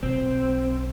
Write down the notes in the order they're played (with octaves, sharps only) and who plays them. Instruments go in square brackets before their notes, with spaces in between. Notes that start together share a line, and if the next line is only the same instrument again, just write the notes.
[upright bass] B1 [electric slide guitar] C4